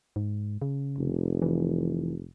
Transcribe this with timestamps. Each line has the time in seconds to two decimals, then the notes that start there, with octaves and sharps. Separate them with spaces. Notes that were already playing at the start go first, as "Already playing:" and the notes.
0.16 G#2
0.62 C#3
0.98 F1
1.42 E3